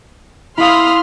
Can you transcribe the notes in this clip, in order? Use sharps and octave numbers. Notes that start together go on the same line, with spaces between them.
E4 F5 B5 C6 D#6 F6